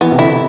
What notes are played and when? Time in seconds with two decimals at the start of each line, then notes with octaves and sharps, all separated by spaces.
0.01 E3 B3
0.12 C3
0.18 D3 E4